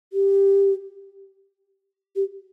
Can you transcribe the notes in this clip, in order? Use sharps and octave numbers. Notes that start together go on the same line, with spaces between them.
G4
G4